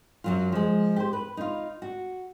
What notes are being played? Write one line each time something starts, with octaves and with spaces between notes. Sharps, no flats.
F#2 F#3 F4
F3 G#3
G4 C5
B4
D#4 F4
F#4